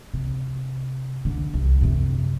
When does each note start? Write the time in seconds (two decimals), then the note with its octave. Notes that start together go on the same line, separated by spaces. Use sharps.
0.14 C3
1.25 D3
1.54 C2
1.81 F#2 C3